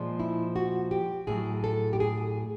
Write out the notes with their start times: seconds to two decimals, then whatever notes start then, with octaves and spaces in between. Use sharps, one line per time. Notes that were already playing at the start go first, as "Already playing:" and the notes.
Already playing: A#2 F3 G#3
0.19 E4
0.56 F#4
0.91 G4
1.27 A2 F#3 G#4
1.64 A4
1.93 G4
2.00 G#4